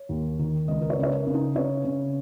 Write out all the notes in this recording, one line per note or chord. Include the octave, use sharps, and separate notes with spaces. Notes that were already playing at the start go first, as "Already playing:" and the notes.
Already playing: C#5
D#2
D#3
C#2 D#5
A#4
C#5
C#3
C#5
A#4
C#3
D#4
C#3 C#5
C#3